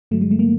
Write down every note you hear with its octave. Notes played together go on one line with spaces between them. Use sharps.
G2 D3 F#3 A3
G#3
A3
A#3